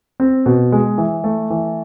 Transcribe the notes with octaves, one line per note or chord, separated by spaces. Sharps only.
C4
B2
G#3
E3
A3
E3